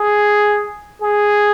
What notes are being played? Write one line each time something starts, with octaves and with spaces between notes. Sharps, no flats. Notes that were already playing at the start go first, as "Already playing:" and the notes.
Already playing: G#4
G#4